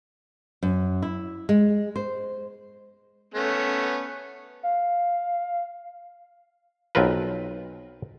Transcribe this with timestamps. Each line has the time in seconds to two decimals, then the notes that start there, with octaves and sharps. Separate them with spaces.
0.63 F#2
1.03 E4
1.49 G#3
1.96 C5
3.34 A3 B3 C#4
4.63 F5
6.95 B1 C4 F4 A#4 B4